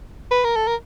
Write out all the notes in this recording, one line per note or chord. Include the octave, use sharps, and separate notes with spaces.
B4
A#4
A4
A#4